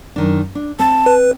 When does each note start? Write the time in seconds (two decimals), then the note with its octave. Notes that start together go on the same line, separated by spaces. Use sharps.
0.16 F#2 D#3 D4
0.55 D4
0.79 C4 A5
1.06 B4